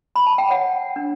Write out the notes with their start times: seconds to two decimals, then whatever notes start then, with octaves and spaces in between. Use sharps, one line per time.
0.16 B5
0.27 A5
0.38 G5
0.50 C#5 F#5
0.96 D4